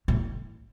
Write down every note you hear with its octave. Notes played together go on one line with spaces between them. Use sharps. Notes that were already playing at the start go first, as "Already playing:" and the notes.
A2